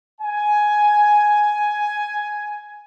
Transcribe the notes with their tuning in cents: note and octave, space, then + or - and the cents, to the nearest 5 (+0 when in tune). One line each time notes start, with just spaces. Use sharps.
G#5 +10